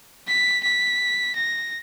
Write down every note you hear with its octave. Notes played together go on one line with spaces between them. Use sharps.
B6
B6
A#6